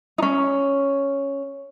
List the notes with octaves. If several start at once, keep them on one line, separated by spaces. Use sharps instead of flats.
C#4 D#4